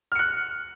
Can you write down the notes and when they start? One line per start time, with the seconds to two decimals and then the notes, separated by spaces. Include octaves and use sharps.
0.12 F6
0.15 C#7
0.19 F#6